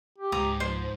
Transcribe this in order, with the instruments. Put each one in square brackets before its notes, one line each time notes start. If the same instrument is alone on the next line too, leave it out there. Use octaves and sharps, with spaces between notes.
[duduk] G4
[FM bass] C#2 [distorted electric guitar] G#2 [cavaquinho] A#5 D#6
[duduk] F3 [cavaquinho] C5